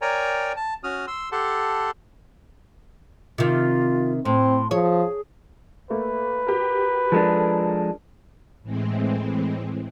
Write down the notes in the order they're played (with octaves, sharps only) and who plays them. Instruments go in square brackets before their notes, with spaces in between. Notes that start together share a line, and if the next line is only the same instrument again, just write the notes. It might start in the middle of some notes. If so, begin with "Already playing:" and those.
[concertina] A#4 C#5 D5 G5 G#5 A#5
A5
C#4 F#4 D#6 F6
C6 E6
G4 A4 F#5 A5 C6
[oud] C3 D#3 [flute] F4
[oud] A2 [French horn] C4 [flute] C6
[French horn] F3 [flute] G#4 [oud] C#5
[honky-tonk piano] A3 A#3 [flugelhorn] B4
[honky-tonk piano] F#4 G4 A#4
[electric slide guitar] F3 G#3 D4 [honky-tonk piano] A4 A#4
[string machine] A2 E3 G#3 C4